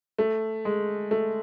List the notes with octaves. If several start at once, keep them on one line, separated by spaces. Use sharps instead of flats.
A3
G#3
A3